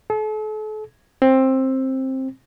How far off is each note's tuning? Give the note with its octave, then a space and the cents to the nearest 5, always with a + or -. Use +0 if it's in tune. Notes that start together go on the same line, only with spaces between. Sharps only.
A4 -40
C4 +15